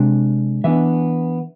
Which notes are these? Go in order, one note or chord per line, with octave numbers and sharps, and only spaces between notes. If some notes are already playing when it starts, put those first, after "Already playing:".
Already playing: C3 G#3 D4
E3 B3 D4 E5